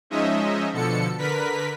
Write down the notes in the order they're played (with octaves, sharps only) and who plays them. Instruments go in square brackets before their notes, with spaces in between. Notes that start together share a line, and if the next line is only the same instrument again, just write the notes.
[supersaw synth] F3 G#3 C#4 D#4 D#5 E5
B2 D3 F3 A4 C#7
D3 A#4 B4 B6